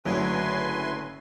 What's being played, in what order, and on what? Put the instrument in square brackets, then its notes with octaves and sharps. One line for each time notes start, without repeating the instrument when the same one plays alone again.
[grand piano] F#1 F#3 [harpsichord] A2 D3 [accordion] B4 G#5 C6